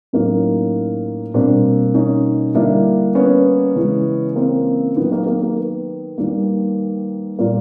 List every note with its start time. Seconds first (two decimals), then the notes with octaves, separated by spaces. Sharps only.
0.13 A2 F#3 A#3 C#4 D#4
1.34 B2 G3 A#3 C4 D4
1.94 C#4 D#4
2.55 D3 G3 A#3 D4 E4
3.15 B3 C#4
3.76 C#3 E3 G#3
4.36 A#3 C4
4.96 D#3 F#3 A#3 B3
5.12 A#3
5.27 A#3
5.42 A#3
5.58 B3
6.18 D#3 G3 A#3
7.39 A#2 G3 A#3